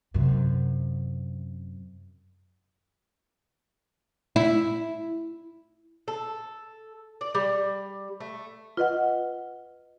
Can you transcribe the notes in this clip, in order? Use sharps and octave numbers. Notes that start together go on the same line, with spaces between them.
F#2 C3
E4
A4
D5
G3
A3
F4 B4 D#5 F#5